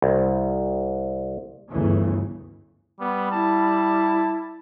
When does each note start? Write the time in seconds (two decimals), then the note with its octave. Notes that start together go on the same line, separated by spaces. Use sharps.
0.02 C2
1.72 G1 D2 C#3 E3
3.00 G3 B3
3.32 E4 A5